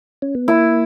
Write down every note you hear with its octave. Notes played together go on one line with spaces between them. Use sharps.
C#4
B3
A#3 E4